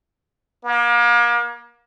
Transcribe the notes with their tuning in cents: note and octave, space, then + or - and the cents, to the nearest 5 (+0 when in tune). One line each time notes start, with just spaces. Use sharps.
A#3 +35